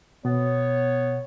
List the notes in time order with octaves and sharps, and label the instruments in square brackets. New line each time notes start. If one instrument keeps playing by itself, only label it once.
[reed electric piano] B2 [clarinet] B3 [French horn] C#5